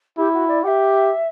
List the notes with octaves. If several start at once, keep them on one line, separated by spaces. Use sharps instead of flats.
E4 G4
F#4
D5
G4 E5 F#5